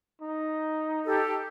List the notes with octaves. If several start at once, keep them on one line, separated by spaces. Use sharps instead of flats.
D#4
G4 A4